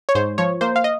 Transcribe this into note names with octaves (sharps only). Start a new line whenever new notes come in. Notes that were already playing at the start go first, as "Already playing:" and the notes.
C#5
G#2 C5
F3 C#5
A#3 C5
F5
D#5